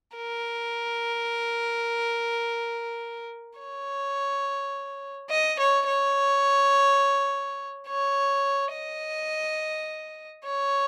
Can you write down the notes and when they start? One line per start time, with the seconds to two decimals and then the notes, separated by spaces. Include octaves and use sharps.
0.17 A#4
3.60 C#5
5.30 D#5
5.60 C#5
5.87 C#5
7.88 C#5
8.73 D#5
10.44 C#5